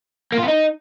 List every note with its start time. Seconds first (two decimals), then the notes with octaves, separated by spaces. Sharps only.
0.32 A#3
0.38 F4
0.43 B3
0.48 D#4